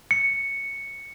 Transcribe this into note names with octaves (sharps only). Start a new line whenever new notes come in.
C#7